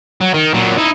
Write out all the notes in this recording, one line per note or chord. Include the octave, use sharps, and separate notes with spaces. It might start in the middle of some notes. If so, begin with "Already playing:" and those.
F#3
D#3
A#2 F#3
D#4 E4